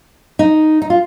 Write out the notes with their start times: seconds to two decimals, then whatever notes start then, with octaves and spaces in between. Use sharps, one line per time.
0.39 D#4
0.82 D#4
0.90 F4